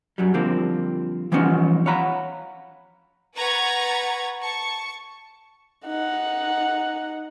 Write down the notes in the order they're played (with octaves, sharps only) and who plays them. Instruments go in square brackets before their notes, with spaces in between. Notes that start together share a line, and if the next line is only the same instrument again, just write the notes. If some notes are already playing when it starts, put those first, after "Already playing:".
[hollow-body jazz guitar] F#2 F#3 G3
D3 F3 G3 A#3 C4
E3 F3 G3 B3 C#4 D#4
C#5 F5 F#5 A#5 B5
[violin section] B4 F#5 A#5 C#6 G#6 A6
A5 C#6 C#7
[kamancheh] D#4 F#5